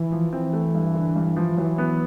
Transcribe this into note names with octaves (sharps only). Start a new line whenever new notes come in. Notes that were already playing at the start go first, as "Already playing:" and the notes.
Already playing: E3
F3
E3 C4
A3
G2
D3
G2
F3
E3 F#3
B3